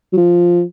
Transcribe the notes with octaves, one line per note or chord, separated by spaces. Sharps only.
F#3
F3